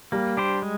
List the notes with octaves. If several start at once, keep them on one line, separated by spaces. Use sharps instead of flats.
G3 A#3
D4 G4 C5
G#3